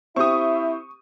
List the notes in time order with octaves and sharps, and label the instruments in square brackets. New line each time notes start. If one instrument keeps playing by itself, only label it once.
[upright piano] C4 G4 [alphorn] E4 [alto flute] E5 [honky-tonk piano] C#6 D#6